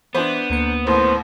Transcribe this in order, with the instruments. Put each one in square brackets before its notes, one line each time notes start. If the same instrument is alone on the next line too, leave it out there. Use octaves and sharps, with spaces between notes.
[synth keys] E3 [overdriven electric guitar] B3 [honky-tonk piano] D4 C5
[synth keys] D2 A#3 C#7
[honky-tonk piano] A1 D#2 A2 [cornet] C5